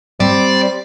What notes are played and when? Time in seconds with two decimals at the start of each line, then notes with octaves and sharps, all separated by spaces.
0.20 G3 C4 D5